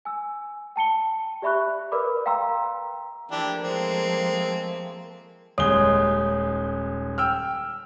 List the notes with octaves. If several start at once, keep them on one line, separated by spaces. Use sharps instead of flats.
G#5 E6
G5 A5 C#7 G7
G4 D5 E5 B5 C#6 F#6
A#4 B4 D5 B5 D6
F5 G5 A#5 C6 E6
E3 F3 A3 A#3 D4 G4
G#3 C4
D#1 G#3 C#5 D#6 G7
G5 E6 F6